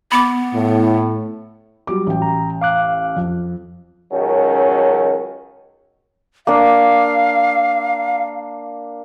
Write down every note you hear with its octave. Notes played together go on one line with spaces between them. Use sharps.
B3 B5 D6
A2
F#3 G3 D6
A1 G5
A#5
F5 D6 F#6
F2
C#2 D#3 F#3 C#4
A#3 D4 F5